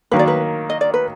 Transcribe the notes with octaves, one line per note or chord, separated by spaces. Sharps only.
D#3 F#3 A#3 B4
D5
B4
D#5
D5
B4